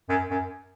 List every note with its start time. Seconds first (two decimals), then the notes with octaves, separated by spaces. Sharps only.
0.09 F#2
0.31 F#2